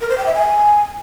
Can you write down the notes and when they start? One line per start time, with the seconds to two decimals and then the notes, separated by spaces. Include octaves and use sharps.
0.01 A#4
0.09 C5
0.18 G5
0.26 E5
0.35 G#5